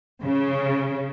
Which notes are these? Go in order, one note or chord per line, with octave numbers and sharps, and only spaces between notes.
C#3